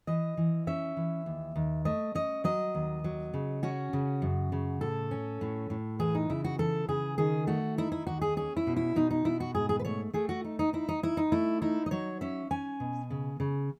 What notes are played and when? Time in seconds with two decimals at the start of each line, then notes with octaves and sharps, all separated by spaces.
0.07 E3 D#5
0.37 E3
0.67 C#4 E5
0.97 E3
1.26 D#2
1.56 D#2
1.85 A3 D#5
2.15 C#4 D#5
2.44 F#3 D#5
2.75 D#2
3.04 F#3
3.34 C#3
3.63 C#4 F#4
3.93 C#3
4.22 F#2
4.52 C#3
4.81 A2 A4
5.11 C#4
5.41 A2
5.70 A2
5.99 E3 G#4
6.15 D#4
6.30 C#3 E4
6.44 F#4
6.58 E3 A4
6.88 C#3 G#4
7.18 D#3 G#4
7.47 A3 F#4
7.78 D#4 E4
7.92 E4
8.07 D#2 F#4
8.21 G#4
8.37 C#4 G#4
8.57 E4
8.67 B2
8.76 E4
8.96 B2 D#4
9.11 D#4
9.25 B2 E4
9.40 F#4
9.55 G#2 G#4
9.69 G#4
9.79 B4
9.85 A3 C#5
10.14 A3 G#4
10.29 F#4
10.44 D#4
10.59 D#4
10.73 D#4 E4
10.89 D#4
11.03 D#4 E4
11.17 D#4
11.32 A3 E4
11.62 D#4 E4
11.86 D#5
11.91 F#3 C#5
12.21 C#4 E5
12.51 C#4 G#5
12.80 B2
13.10 C#3
13.40 C#3